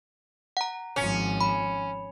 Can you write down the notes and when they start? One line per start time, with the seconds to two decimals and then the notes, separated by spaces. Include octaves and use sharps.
0.57 F#5 A#5
0.96 G#1 F3 C#4
1.41 B5